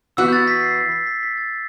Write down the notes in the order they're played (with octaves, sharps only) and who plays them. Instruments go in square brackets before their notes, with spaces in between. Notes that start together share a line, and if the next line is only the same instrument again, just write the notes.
[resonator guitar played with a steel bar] E3 B3 F#4 [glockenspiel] E6
[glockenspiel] G6
A6
B6
C7
B6
B6
B6
B6
A6